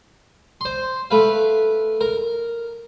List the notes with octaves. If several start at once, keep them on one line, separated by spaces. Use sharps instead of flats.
C5 C6
A3 B4 F5
A#4